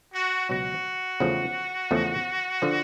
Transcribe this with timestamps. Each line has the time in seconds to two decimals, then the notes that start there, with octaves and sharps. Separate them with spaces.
0.13 F#4
0.49 C#2 B2 F#3 F#4
1.20 E2 C#3 F3 A3
1.91 E2 C#3 F3 A3
2.62 D3 F3